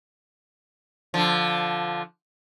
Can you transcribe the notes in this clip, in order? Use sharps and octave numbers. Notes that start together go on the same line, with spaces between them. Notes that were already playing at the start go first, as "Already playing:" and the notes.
D3 F3